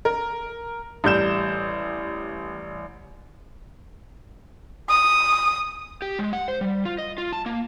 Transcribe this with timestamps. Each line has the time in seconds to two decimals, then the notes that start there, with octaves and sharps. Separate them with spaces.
0.05 A#4
1.04 A1 G3 G6 E7
4.89 D#6
6.02 G4
6.19 G#3
6.33 F#5
6.48 C5
6.61 G3
6.85 F4
6.98 D#5
7.18 F4
7.33 A5
7.46 A#3